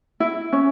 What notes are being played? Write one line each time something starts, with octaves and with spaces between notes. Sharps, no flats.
E4
C#4